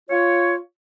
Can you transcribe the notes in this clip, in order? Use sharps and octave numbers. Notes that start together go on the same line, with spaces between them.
F4 C#5